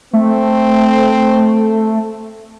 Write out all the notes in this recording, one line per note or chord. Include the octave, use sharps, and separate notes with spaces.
A3 C4